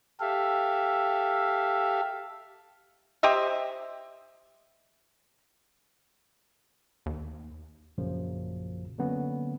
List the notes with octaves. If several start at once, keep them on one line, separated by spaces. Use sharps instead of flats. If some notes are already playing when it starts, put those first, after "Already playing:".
G4 A4 E5 F5
G4 C5 D#5 E5
D#2
A#1 F#2 A#2 C#3 F3
D3 F#3 A#3 B3 C#4